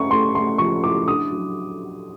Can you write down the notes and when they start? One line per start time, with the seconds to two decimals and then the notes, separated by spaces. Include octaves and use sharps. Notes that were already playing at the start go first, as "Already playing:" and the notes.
Already playing: C#4 E4 C#6
0.10 A3 C6
0.35 A3 C6
0.58 F3 C#6
0.83 E4 D6
1.07 D4 D#6
1.32 F#3